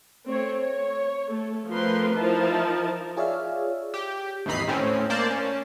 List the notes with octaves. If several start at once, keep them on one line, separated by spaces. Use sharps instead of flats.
A3 C4 C#5
C#5
A3 A4
F3 A3 C4 A#4 B4 C6
F3 D#4 E4 A#4 A5
F4 G#4 C#5 D5 E5 F5
G4
G#1 D#2 E3 D#4 B5 C7
A2 C4 C#4
A#3 C5 D5 A5
C#4